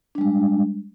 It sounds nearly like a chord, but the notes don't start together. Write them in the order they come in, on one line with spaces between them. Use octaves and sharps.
D4 G3 G#3